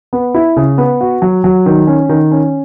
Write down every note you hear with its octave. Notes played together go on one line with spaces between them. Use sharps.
B3
E4
C#3
B3
F#4
F#3
F#3
D#3
C#4
D#3
C#4